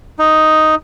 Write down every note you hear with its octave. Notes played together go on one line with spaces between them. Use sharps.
D#4